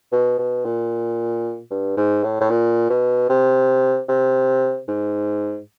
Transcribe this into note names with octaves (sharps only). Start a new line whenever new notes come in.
B2
B2
A#2
G2
G#2
A2
A2
A#2
B2
C3
C3
G#2